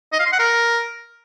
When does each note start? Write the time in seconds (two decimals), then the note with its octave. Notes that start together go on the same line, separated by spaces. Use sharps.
0.13 D#5
0.19 F5
0.26 C6
0.32 F#5
0.39 A#4